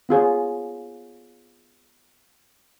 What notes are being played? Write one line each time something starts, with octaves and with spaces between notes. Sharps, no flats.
B3 F4 G#4 C#5